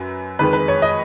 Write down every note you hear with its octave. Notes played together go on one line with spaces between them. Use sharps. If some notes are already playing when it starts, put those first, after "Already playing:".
Already playing: F#2 B4
F2 D#3 G#3 B4
B4
C#5
D#5